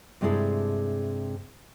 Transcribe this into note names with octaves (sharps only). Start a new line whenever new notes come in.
G2 C3 G#3 E4 G#4 A4